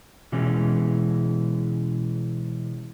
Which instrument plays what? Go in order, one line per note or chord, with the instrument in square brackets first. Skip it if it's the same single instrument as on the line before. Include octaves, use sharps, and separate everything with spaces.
[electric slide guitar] B2 E3 G#3 C#4